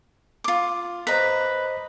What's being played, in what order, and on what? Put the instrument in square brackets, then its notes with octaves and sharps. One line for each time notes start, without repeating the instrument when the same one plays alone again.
[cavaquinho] F4 D6
[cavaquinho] B4 A#5 [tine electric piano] C5 D#5 B6